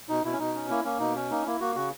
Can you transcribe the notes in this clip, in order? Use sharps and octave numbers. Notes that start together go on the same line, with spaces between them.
B2 D#4
B2 E4
C#4
B2 D#4
C#4
A#3 E4
A#3 C#4
B2 D#4
C#4
A#3 D#4
A#3 E4
A#3 F#4
C#3 F#4